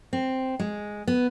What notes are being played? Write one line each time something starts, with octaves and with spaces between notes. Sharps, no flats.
C4
G#3
B3